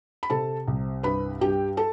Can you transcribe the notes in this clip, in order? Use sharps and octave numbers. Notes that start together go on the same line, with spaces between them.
B5
C3 A4 A5
C2
G2 B4 B5
G2 G4 G5
A4 A5